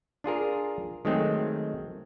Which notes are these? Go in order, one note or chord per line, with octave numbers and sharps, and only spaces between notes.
D4 F4 G#4 A#4
D#3 F#3 G#3 A3 C4